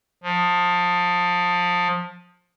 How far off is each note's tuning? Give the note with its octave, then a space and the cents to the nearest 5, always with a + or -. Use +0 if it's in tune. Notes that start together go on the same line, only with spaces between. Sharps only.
F3 +25